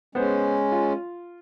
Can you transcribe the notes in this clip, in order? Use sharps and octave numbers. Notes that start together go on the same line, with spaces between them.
G#3 B3 C#4 C5
F4